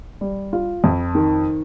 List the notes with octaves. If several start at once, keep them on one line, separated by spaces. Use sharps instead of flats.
G3
F4
F2
D#3